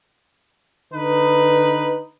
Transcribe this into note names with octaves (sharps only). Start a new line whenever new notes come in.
D3 D#4 B4